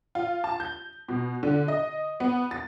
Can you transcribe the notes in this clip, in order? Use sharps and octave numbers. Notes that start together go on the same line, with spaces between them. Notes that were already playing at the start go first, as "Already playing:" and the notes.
F4
A5
G6
B2
D3
D#5
B3
A6